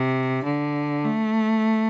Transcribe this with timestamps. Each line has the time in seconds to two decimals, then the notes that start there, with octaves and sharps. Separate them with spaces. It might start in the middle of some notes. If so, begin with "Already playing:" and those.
Already playing: C3
0.44 D3
1.04 A3